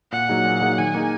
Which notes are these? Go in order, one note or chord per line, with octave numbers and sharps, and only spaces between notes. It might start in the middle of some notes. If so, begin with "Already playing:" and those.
A#2 F#5
F#3 A#3 D#4 G#4
A#2
F#3 A#3 D#4 G#4
D#3 G#5
A#3 D#4 G#4